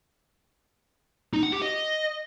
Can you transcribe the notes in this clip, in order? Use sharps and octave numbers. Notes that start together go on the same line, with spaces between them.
D#4
F#5
G4
D#5